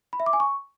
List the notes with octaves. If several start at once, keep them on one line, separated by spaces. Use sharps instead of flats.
B5
E5
D6
G#5
C#6